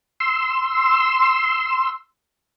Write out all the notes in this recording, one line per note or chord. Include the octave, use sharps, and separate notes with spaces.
C6 E6